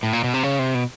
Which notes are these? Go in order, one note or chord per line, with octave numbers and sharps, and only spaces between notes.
A2
A#2
B2
C3
C#3
C3
B2